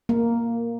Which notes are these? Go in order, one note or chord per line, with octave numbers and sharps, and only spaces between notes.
A#3